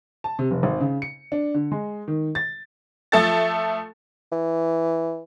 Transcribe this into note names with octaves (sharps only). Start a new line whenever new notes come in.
A5
C3
F1
G#1
C#3
C#7
D4
D3
G#3
D#3
A6
F3 A3 A4 A5 A6
E3